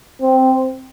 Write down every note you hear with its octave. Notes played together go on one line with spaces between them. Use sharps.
C4